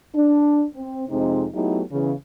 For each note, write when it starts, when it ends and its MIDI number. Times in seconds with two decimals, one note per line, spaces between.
0.14 0.64 62
0.75 1.04 60
1.08 1.46 41
1.08 1.46 48
1.08 1.46 56
1.08 1.46 60
1.08 1.46 63
1.54 1.82 54
1.54 1.82 57
1.54 1.82 59
1.54 1.82 63
1.54 1.82 64
1.54 1.82 67
1.92 2.11 40
1.92 2.11 49